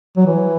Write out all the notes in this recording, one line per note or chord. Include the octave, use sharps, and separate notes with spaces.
F#3
E3